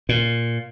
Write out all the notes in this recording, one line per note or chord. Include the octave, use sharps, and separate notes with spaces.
A#2